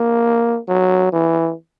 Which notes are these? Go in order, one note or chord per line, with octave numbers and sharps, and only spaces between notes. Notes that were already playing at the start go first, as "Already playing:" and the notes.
Already playing: A#3
F#3
E3